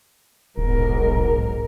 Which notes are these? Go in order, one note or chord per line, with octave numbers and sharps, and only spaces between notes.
D#1 B1 G#2 B3 A#4
A#4